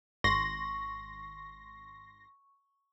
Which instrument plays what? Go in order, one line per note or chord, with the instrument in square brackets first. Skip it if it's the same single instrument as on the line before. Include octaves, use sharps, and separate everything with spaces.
[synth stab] G#1 C6 A#6 [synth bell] C#6